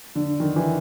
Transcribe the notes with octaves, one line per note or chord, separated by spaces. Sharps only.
D3
D#3
E3